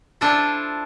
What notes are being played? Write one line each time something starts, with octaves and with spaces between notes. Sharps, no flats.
D4 E4 F4 A4 C5